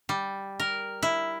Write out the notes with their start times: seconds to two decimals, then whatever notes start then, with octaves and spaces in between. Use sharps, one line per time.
0.09 G3
0.60 A#4
1.03 E4